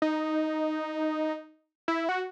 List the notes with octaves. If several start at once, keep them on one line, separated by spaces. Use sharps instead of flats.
D#4
E4
F#4